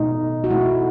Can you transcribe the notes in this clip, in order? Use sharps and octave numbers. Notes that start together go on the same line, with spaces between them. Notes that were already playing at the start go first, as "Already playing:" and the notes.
Already playing: B2 A3 D#4
F#4
B2 A3 E4